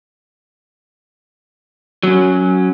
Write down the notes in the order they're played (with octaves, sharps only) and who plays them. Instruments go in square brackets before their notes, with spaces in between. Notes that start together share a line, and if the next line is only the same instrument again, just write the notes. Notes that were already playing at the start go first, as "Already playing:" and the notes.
[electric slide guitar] F#3 C#4